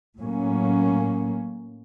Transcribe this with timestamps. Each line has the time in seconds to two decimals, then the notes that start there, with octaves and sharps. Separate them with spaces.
0.19 A2 F#3 A#3 C#4